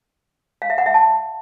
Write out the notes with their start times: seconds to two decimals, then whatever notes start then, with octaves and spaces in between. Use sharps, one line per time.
0.62 F5
0.70 E5
0.78 F#5
0.86 E5
0.94 A5